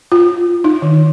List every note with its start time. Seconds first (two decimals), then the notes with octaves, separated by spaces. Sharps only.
0.12 F4
0.64 D#4
0.82 D#3